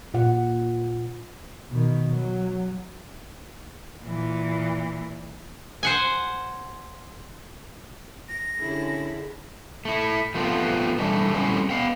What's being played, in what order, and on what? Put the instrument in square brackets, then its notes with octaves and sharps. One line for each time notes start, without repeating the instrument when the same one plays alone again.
[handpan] A#2 F#5
[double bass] B2 D#3
F#3
[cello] A#2 E3
[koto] C5 F#5 G#5
[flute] A#6
[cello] D3 E4 [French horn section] C#4 G4 G#4
[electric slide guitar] A3 E4
F3 A3 B3 C4 F4
A2 D3 E3 G3 A3
F#3 G3 A3 C4 C#4 E4
B3 F5 G5